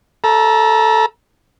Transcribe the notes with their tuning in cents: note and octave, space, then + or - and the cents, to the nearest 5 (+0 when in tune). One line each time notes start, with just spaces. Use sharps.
A4 +0 A#5 +30